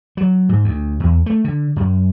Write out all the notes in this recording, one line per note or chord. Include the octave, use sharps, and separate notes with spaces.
F#3
G#2
D2
E2
A3
D3
F#2